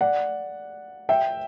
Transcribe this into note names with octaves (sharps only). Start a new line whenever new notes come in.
D5 F#5
E5 G5